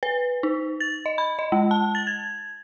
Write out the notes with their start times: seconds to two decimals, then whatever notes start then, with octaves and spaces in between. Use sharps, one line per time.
0.03 B4
0.43 D#4
0.80 A6
1.06 D#5
1.18 B5
1.39 D#5
1.52 G#3
1.71 A5
1.95 A6
2.07 G#6